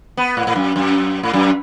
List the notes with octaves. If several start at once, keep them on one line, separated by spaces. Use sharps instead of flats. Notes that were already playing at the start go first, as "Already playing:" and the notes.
B3
A2
A2
F#2
F#2
A2
F#2